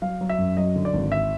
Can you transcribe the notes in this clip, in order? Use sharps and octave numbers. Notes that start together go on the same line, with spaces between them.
F#3 F5
F#3
E5
F#2
F#3 D#5
D3
D5
G#1
E5